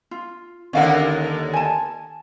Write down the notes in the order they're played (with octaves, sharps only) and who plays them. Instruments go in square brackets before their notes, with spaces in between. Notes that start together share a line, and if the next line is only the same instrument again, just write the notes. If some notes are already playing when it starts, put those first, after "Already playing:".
[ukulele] F4
[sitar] D#2 D3 A#4 [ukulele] C#4 F5 F#5
[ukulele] G#5 A5